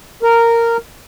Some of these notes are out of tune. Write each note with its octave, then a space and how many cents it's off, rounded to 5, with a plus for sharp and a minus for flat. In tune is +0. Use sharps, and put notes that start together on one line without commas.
A#4 -10